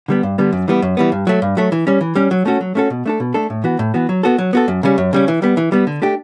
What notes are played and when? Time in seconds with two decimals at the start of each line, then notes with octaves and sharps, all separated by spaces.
0.08 D3 G3 B3
0.23 G2
0.38 D3 G3 B3
0.53 F#2
0.68 E3 G3 B3
0.82 F#2
0.97 E3 G3 B3
1.12 G2
1.27 F#3 A3
1.42 G2
1.57 F#3 A3
1.72 E3
1.87 G3 C#4
2.01 E3
2.15 G3 C#4
2.31 F#3
2.46 A3 C#4 F#4 A4
2.61 F#3
2.75 A3 C#4 F#4 A4
2.90 B2
3.06 A3 D4 A4
3.20 B2
3.34 A3 D4 A4
3.50 A2
3.64 E3 B3 F#4
3.79 A2
3.94 E3 B3 F#4
4.09 F#3
4.23 B3 F#4 A4
4.38 F#3
4.53 B3 F#4 A4
4.68 F#2
4.83 C#3 G3 C#4
4.98 F#2
5.13 C#3 G3 C#4
5.28 E3
5.42 G3 B3
5.57 E3
5.72 G3 B3
5.87 D3
6.02 A3 D4 G4